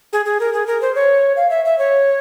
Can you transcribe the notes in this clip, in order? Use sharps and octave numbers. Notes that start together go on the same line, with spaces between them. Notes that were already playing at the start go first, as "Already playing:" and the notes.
G#4
G#4
A#4
G#4
A#4
C5
C#5
F5
E5
E5
C#5